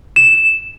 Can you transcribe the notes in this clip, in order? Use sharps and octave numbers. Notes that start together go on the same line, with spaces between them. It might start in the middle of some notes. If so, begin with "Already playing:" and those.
E7